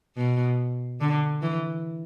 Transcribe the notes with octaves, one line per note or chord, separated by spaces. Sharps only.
B2
D3
E3